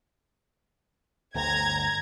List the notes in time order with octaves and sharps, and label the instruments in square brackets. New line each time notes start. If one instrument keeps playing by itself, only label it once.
[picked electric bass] G1 D2 [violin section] A#5 G#6